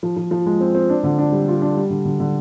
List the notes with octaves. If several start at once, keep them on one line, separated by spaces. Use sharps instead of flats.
F3
F3
F3
G#3
C4
C4
D4
D3
D4
G3
F4
D4
G3
D3
D3
D3